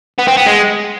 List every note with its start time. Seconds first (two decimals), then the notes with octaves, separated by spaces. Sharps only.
0.19 B3
0.28 C4
0.37 B3
0.46 G#3